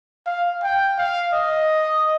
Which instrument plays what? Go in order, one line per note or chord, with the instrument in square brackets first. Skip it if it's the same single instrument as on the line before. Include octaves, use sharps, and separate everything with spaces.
[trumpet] F5
G5
F5
D#5